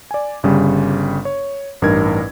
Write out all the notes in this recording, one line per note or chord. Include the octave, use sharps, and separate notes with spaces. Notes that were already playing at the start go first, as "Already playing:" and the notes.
D5 G#5
G1 C#3 G3
C#5
A1 G2 D#4 A#4 G#6